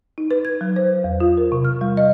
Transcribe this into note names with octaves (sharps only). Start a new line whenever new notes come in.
D#4
B4
G#6
F#3
C5
E2
F4
A#4
C3
F6
G3
D#5